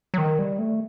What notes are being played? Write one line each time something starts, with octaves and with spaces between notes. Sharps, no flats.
F#3
D#3
G3
A3